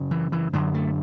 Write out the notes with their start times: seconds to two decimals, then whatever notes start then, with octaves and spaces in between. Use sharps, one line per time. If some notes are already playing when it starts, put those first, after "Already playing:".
Already playing: F#2 C#3
0.11 E3
0.32 E3
0.53 F#2 D3 F#3
0.74 A3